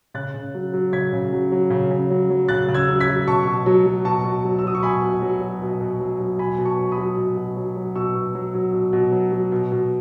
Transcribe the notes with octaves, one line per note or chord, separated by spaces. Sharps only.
C#3 F#6 A6
C#3
F#3
F#3
C#3 G#6 B6
C#3
F#3
F#3
C#3
C#3
F#3
F#3
C#3 F#6 A6
C#3
E6 G#6
F#3
G#6 B6
F#3
B2 A5 C#6
B2
F#3
F#3
B2 A5 C#6
B2
F#3
E6
F#3 D#6
C#6
B2 G#5 B5
B2
F#3
F#3
B2
B2
F#3
F#3
B2 G#5 B5
B2
A5 C#6
F#3
B5 D#6
F#3
B2
B2
F#3
F#3
B2 C#6 E6
B2
F#3
F#3
B2
B2
F#3
F#3
B2
B2